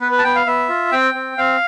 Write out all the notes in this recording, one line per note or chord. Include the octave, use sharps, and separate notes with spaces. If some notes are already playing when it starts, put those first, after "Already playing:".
B3 B4
B4
A5
B3 G5
F5
B3 E5
F4
C4 G5
C4
C4 F5